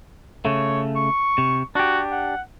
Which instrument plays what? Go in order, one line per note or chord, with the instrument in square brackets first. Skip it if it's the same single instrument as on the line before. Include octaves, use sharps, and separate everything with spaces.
[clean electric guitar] C#3 A3 [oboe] C#5
[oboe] C#6
[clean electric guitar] C3
[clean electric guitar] D4 G4 [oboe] F#4
[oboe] F#5